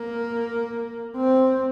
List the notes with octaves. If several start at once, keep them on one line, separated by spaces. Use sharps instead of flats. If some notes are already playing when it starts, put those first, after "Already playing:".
Already playing: A#3
C4